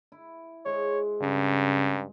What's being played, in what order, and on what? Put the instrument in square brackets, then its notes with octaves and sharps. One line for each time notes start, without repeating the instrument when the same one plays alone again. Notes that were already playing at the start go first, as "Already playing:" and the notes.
[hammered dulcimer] E4
[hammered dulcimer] G#3 C5 [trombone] C#5
[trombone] G2 [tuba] C#3